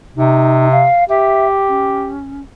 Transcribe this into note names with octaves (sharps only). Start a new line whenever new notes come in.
C3 D#4
F5
G4 E5
C#4